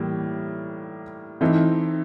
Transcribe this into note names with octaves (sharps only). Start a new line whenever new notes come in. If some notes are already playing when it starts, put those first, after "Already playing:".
Already playing: A2 E3 G3 A#3
E3 A3 C4 D#4